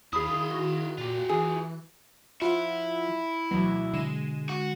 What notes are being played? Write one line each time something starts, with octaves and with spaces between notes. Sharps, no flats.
D#2 E4 G#4 F5 B5 D#6
D#3
F#4
A#2 F4 G4
E3 G#4
F3 E4 F4 F#5
D2 B2 E3 F#3
D3 G#3 D#7 E7
F#4